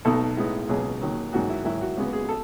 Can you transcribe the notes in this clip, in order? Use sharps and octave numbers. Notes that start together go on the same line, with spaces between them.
B1 B2 A3 D#4 A4
A2 G#3 B3 D#4
C#2 B2 F#3 G#4
D#2 D#3 F#3
A1 G#2 D#3 F#3 F#4
E4
G#2 D#3 F#3 E4
F#4
C#2 C#3 G#3 B3 F#4
G#4
A4